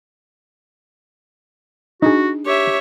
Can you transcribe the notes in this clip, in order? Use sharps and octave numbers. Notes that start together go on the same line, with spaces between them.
D4 D#4 F#4 G#4
G4 C#5 E5